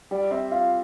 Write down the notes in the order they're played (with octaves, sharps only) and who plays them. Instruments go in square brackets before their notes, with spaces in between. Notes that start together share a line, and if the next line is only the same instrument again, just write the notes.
[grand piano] G3 [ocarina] D5
[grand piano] C4 [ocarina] E5
[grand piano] F4 [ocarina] F5